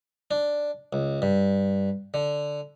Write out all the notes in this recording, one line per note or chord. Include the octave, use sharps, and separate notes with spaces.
D4
C#2
G2
D3